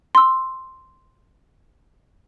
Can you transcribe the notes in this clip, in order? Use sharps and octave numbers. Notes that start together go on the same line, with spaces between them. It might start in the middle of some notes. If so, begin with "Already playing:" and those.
C6 E6